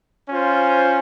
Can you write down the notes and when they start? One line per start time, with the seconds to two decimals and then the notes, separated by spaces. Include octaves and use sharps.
0.27 C#4 F4 C5